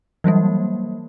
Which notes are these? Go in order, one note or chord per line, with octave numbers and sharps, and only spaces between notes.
E3 F#3 G3 A#3